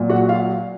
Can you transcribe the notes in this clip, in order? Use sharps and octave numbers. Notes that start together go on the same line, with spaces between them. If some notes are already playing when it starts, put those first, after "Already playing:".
Already playing: A#2 F#3
F#4 F#5
F4 F5